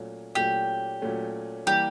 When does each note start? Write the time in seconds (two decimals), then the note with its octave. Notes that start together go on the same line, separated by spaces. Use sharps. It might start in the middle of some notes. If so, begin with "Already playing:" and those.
Already playing: A#2 F#3 A3 C#4
0.35 A#2 F#3 A3 C#4 G4
1.02 A#2 F#3 A3 C#4
1.66 E3 G3 A#3 G4